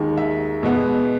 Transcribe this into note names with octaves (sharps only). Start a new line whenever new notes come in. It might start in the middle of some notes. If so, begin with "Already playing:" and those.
Already playing: D#2 D#3 G#3
E5
B2 G#3 B3